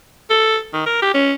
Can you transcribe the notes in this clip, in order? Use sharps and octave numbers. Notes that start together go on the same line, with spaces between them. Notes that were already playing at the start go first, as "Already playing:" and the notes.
A4
D#3
A#4
G4
C#4